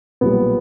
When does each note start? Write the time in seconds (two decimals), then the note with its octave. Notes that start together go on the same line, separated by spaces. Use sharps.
0.21 B1 A#2 G3 B3